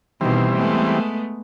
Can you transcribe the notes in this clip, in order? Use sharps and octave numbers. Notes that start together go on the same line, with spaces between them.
B2 D#3 E3 G3 C4
G#3 A3 B3